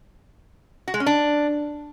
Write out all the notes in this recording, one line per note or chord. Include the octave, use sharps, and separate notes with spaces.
F#4
G#3
C#4
D4